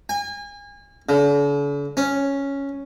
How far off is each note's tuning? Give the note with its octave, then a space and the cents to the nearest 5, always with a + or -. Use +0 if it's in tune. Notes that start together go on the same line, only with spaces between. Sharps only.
G#5 -35
D3 -45
C#4 +0